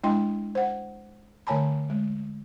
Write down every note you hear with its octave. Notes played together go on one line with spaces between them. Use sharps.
G#3 D4 E4 D#5 G5 C6
C5 F#5
D3 A3 C#5 G#5 A5 B5
G#3